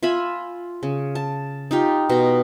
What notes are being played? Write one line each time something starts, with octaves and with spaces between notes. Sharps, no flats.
F4 E5 G#5 B5
C#3
A5
D#4 F4 G4
B2 A#5